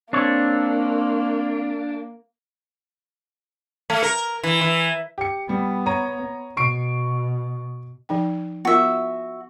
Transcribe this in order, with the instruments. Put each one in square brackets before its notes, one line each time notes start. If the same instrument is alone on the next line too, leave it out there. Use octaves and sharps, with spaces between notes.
[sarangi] A#3 [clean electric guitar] C4 C#5 [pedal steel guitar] D4
[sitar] A3
A#4
E3
E3
[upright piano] G4 C#7
[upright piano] G3 [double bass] B3
[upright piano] C#5 A#5 D#7
[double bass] B2 [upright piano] C#6 C7 D7
[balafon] F3 D#4 G5
[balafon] B3 F4 A#4 [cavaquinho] F#4 E5